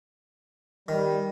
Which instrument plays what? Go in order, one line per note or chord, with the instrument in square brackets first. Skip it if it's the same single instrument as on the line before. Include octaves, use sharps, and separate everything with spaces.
[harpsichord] D#3 [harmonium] G3